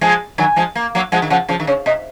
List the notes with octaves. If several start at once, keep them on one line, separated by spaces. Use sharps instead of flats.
F3 G#3 G#5
D#3 F#3 G#5
F3 G#3
A#3
F#3 A#3
F3 G#3 F#5
D#3
C#3 F3 F#5
C#3 F3
D#3
C#3 C#5
C3 D#5